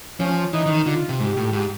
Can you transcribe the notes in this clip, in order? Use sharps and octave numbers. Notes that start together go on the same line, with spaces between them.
F3 C#4
E3 D#4
E3
D#3
D3 F4
C3
G#2 G4
A2
G#2